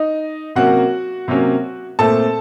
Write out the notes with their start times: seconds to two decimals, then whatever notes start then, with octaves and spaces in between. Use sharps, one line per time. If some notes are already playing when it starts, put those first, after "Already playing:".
Already playing: D#4 D#5
0.56 C3 F#3 A#3 C#4 F#4 F#5
1.28 C3 F#3 A#3 C#4
1.99 A#2 A3 C4 A4 A5